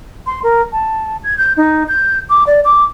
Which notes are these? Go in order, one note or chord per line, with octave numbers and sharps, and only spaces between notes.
C6
A#4
A5
G#6
G6
D#4
G6
D6
D5
D6